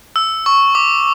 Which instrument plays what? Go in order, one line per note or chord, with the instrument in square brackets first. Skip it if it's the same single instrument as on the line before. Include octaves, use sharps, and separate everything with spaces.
[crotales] E6
C#6
D6